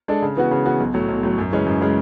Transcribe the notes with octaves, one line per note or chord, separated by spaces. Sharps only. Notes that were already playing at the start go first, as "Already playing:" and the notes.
G#3 D4 A4
C#3
E3 B3 F#4
C#3
E3 B3 F#4
B1
A2 F#3
B1
A2 F#3
F#2
C#3 E3 G#3 C#4
F#2
C#3 E3 G#3 C#4